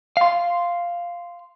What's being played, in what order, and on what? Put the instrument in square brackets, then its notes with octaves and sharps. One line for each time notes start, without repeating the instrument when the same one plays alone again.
[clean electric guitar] F5 C6